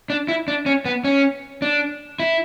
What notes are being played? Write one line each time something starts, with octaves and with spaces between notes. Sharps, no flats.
D4
E4
D4
C#4
B3
C#4
D4
E4